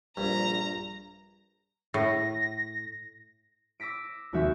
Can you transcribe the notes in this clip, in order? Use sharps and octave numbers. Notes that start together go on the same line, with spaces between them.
A#1 G2 A#5
A2 A#6
D6 E6 A#6 B6 D7
F1 D#2 G#3 F#4 E5 G6